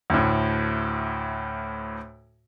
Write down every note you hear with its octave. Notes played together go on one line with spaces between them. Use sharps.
D2 A2